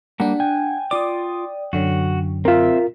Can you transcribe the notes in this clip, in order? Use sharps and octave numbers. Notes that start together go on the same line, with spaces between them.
G3 A#3 D4 F#5
G5 G#5
F4 D5 D6 D#6
F#2 D3 F#3 F#4
C4 F4 A#4 E5